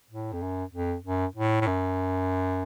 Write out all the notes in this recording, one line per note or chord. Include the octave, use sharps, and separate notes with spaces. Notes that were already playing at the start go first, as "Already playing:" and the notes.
A2
F2
F#2
F2
F#2
A2
A2
F#2